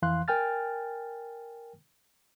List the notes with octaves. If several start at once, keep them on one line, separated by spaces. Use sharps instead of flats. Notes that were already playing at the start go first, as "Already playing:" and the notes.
F2 E3 F5 C6 F#6
A#4 G5 G#5 F6 A6